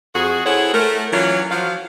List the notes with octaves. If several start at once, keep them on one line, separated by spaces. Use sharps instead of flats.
F2 F#4 G#4
E4 G#4 A4 C5 C#5 F#5
A3 A#4
E3 F#3 C#4 D4 F4 C#5
F3 F#3 F5